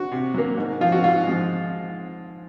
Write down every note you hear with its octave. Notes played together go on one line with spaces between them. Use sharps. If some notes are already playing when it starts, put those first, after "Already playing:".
Already playing: F#4
C3
F#3 A#3
G#2
F3 C4 F4
F#4
G#2 F4
F3 G#3